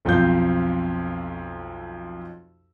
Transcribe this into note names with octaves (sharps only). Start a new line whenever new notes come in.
B1 F2 C4 F4 G6